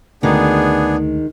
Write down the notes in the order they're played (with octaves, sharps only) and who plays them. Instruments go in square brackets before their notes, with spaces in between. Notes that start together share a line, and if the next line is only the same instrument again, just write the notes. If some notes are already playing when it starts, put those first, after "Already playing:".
[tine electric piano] D2 [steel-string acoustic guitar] D#3 G#3 [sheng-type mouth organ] B3 D4 G#4